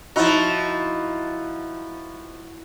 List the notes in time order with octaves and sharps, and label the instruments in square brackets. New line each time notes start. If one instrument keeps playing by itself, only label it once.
[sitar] F3 D#4 [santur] E4 F#4